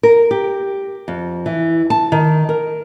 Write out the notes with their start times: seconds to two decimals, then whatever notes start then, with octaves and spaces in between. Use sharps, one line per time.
0.03 A#4
0.31 G4
1.08 F2
1.46 E3
1.90 A5
2.12 D#3
2.49 A#4